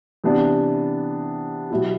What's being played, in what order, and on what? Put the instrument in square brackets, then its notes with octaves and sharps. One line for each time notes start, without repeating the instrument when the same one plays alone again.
[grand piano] C3 E3 B3 D4
B2 F#3 B3 E4 G4